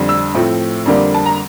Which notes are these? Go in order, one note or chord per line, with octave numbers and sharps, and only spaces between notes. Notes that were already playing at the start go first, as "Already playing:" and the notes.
Already playing: F2 D3 G3
E6
A2 F3 A3 C4
F2 D3 G3 A#3
A5
A#5